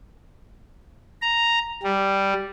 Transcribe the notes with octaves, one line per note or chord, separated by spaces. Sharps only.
A#5
G3